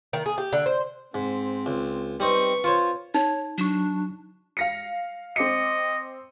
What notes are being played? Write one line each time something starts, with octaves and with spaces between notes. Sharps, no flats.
D#3
G#4
G4
D3
C5
G#2 C4
C#2
G3 C4 D#4 B4 C#6
F4 C5 C#5
D#4 C#5
F#3 D4 C#6
F5 A#6 C#7
C4 D#5 D6 C#7